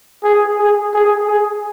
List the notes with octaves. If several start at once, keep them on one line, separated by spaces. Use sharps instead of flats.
G#4
G#4
G#4
G#4